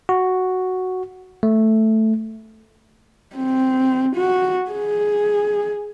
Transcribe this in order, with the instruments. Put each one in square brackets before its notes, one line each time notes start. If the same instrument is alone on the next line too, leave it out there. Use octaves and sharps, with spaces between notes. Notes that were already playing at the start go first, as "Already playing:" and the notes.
[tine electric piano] F#4
A3
[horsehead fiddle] C4
F#4
G#4